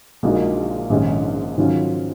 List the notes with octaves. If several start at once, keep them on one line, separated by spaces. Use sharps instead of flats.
A#1 A#2 G#3 D#4 F#4
A#1 G#2 D#3 G#3 C#4
G#2 D#3 F#3 C#4 F4